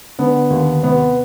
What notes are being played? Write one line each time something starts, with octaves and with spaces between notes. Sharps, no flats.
D3 B3
D#2
C3 B3